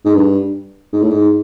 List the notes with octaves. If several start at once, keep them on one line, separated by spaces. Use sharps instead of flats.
G#2
G2
G#2
A2
G#2